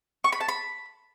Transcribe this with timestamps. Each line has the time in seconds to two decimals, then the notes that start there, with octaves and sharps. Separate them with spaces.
0.24 C#6
0.32 B5
0.40 A5
0.48 B5